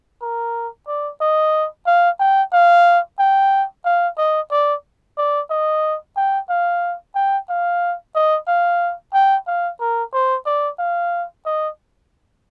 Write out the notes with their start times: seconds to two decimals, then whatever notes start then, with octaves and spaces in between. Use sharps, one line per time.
0.22 A#4
0.87 D5
1.21 D#5
1.87 F5
2.20 G5
2.53 F5
3.19 G5
3.85 F5
4.18 D#5
4.51 D5
5.18 D5
5.50 D#5
6.16 G5
6.50 F5
7.15 G5
7.49 F5
8.15 D#5
8.48 F5
9.14 G5
9.47 F5
9.80 A#4
10.14 C5
10.46 D5
10.79 F5
11.46 D#5